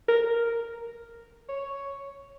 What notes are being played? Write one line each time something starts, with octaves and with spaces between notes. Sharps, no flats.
A#4
C#5